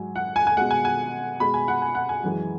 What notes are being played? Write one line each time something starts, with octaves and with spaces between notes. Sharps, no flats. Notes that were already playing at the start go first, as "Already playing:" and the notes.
Already playing: G#2 F#3 G#5
F#5
G#5
G#5
B2 G#3 F#5
G#5
G#5
B2 G#3 B5
G#5
F#5
G#5
F#5
G#5
F#2 E3 G#3